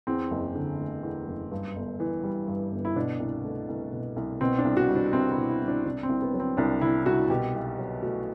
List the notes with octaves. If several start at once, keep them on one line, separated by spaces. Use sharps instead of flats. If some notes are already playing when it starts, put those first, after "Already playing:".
E2 C4
F#1
D3
A3
E2
F#1
G2
G1
E3
G3
G2
G1
E4
B2 D4
C2
A3
C2
B2
C2
B2 C4
D4
C2
F#4
G3
D4
C2 C4
E4
B2
E4
C2
D4
C3 D4
C4
C2
B3
F#3
C4
C2 D4
C3 E4
C2 F#4
B2 G4
B1
F#3
A3 F#4